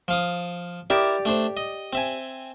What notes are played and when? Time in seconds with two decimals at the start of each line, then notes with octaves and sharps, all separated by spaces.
0.08 F3 F5 D#6
0.90 E4 G4 A#4 D5 E5
1.25 A3 D4 C5
1.57 D#5
1.93 C4 E5 G#5